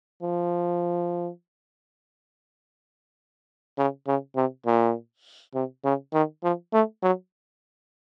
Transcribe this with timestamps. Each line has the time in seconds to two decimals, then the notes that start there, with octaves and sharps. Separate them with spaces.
0.23 F3
3.78 C#3
4.07 C#3
4.36 C3
4.66 A#2
5.54 C3
5.84 C#3
6.13 D#3
6.44 F3
6.73 A3
7.02 F#3